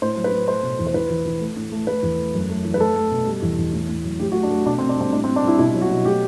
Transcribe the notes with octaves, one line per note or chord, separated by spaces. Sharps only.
A2 C5
F#3
B4
A2
A3 C5
B2
E2
C5
E3 B4
E3
E3
A3
A2
A3
A3 B4
E2
A3
F#2
A3
E3
B4
A3 A4
A3
B2
G3
E2
E2
A2
A2
F#3
A2 G4
F#4
A3
D4
A3
B2 D4
C4
B2
D4
G3 C4
A2 D4
C4
A2
D4
G3 E4
B2 E4
F#3
F#4
B2
A3 G4